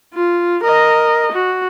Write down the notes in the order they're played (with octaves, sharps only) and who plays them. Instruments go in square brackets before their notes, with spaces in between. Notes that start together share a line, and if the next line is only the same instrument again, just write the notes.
[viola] F4
A#4 D#5
F#4